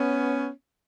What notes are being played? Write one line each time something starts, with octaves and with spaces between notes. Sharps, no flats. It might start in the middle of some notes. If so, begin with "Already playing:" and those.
Already playing: B3 C#4